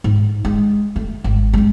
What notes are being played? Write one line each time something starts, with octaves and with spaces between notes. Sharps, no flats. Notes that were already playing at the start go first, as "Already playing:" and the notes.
G#2
G#3
A3
G#1
G#3 C4